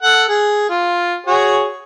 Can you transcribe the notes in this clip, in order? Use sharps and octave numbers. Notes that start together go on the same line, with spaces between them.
A4 F#5
G#4
F4
F#4 G#4 C#5